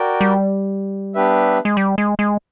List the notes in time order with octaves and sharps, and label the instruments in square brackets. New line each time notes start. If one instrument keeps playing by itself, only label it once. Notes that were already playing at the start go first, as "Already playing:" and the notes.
Already playing: [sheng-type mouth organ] F#4 A#4 D5 G5
[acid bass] G3
[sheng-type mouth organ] B3 D4 G4 B4 E5
[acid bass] G#3
G3
G#3
G#3